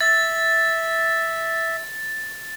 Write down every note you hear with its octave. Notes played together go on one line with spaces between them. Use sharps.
E5 A6